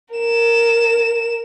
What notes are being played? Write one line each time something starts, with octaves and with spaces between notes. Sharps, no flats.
A#4 E7